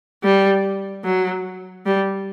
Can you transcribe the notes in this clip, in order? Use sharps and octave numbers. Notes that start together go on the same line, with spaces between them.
G3
F#3
G3